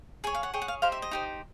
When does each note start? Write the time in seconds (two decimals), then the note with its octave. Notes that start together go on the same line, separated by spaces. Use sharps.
0.24 G#4 C#5 G#5
0.34 F5
0.43 F#5
0.53 G#4 C#5 G5
0.62 F#5
0.68 F5
0.82 D#4 G4 C5 F5
0.92 E5
1.02 D#5
1.11 D#4 G4 C5